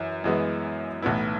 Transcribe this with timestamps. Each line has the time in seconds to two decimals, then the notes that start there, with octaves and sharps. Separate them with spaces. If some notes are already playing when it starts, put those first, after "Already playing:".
Already playing: F#2 E3
0.24 F#2 E3 G#3 B3
1.02 B1 A2 E3 B3 E4